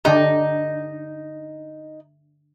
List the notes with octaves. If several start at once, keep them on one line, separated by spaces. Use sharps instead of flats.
D3 D4 D#4 G4